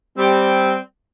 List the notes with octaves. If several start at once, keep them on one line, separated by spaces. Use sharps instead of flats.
G3 C4